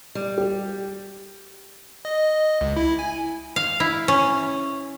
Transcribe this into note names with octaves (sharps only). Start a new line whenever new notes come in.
G3
G4
D#5
C#2
E4
G#5
F5
E4
C#4